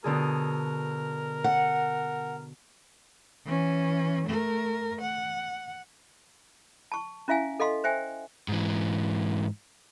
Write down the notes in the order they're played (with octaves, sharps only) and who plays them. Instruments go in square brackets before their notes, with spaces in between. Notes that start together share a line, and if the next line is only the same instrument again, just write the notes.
[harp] B2 D3 G#4 [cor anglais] A#4
[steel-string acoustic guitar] F#5
[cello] E3 C#4
A3 A#4
F#5
[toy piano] A5 C#6
C#4 E4 E5 F5 G#5
A4 D#5 F5 C6
C5 E5 G5 G#5
[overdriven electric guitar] G#2 E3